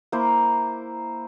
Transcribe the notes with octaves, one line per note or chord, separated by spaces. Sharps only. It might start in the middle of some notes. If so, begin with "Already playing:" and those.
A#3 E4 C5